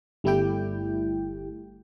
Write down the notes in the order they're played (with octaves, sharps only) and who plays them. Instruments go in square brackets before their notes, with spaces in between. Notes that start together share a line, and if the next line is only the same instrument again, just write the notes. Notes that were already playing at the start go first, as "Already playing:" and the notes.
[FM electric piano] G1 G3 A3 E4 G4 G5